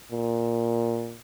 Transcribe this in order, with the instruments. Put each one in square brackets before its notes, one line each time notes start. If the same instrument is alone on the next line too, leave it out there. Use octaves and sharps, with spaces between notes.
[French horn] A#2